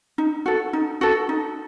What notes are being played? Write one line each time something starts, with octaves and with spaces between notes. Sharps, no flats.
D#4
F#4 A4
D#4
F#4 A4
D#4